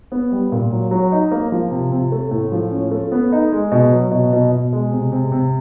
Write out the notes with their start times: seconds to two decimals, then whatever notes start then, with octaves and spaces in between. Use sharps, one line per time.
0.12 B3
0.32 G3
0.52 A#2
0.72 F#3
0.91 F#3
1.12 D#4
1.32 A#3
1.52 F3
1.71 C3
1.91 C3
2.12 A3
2.31 A2
2.52 F3
2.71 C#4
2.91 A3
3.12 B3
3.32 D#4
3.52 G#3
3.72 B2
3.92 F#3
4.11 B2
4.33 B2
4.52 B2
4.73 G#3
4.92 C3
5.12 C3
5.32 C3